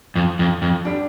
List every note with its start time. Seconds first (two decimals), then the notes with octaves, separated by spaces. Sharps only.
0.15 F2
0.39 F2
0.62 F2
0.85 D3 G3 D4